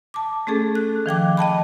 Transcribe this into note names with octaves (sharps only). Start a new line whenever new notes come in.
A5 D6
A3 C#4 G#4 A4
F#6
D#3 F3 G5 D6
D#5 G5 A5 B5